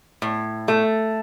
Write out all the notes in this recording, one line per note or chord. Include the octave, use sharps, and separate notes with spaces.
A2
A3